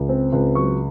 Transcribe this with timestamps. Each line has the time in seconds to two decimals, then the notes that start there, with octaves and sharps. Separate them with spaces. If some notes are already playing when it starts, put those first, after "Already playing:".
Already playing: C#2
0.09 C4
0.32 C#2
0.55 F#3 C#6